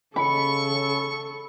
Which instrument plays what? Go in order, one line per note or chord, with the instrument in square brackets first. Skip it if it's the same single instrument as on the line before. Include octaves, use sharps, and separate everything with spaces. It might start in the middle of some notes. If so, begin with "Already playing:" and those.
[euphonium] C#3 [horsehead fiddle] A4 [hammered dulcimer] B5 [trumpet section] C#6